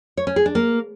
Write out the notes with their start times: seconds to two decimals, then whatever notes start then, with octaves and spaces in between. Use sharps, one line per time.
0.17 C#5
0.27 C#4
0.36 G#4
0.46 D4
0.55 A#3